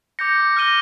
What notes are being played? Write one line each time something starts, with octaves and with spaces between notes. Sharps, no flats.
D6 G6 A#6 C#7
F6 A#6 D#7 G7